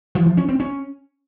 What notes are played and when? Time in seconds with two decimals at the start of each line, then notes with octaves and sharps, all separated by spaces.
0.15 E3
0.26 F3
0.37 C#4
0.49 C4
0.60 C#4